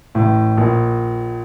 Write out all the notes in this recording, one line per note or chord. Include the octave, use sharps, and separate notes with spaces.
A1 A2
A#1 A#2